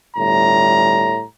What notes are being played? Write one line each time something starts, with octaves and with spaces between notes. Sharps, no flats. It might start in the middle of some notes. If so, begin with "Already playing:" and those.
G1 A2 G3 A#5